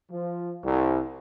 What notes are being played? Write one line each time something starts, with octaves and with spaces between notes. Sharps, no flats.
F3
C2